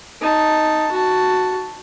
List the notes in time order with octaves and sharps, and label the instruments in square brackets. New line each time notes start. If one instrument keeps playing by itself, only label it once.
[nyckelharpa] D#4 A5
F#4 A5